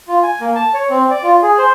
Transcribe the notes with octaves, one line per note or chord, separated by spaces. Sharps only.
F4
G#5
A#3
A5
C#5
C4
D5
F4
G#4
C5